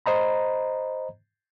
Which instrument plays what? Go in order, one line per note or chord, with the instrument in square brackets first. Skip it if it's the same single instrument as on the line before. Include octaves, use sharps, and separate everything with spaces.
[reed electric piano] C5 D#5 A#5 B5